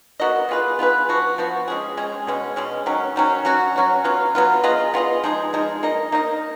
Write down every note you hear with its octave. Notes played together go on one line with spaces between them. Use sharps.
B3 F#4 A#4 D#5
B3 F4 G#4 B4
B3 F4 G#4 B4
F3 B3 F#4
F3 B3 F#4
G#3 C#4 G#4
G#3 C#4 G#4
B2 G#3 C#4
B2 G#3 C#4
D#3 F#3 C#4
D#3 F#3 C#4
F#3 C#4 F#4
F#3 C#4 F#4
F#3 B3 F4
F#3 B3 F4
B3 F4 G#4 D#5
B3 F4 G#4 D#5
F3 G#3 D#4 G#4
F3 G#3 D#4 G#4
A#3 D#4 A#4 D#5
A#3 D#4 A#4 D#5